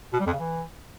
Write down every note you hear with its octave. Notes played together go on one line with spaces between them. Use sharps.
B2
G3
F2
C#3
E3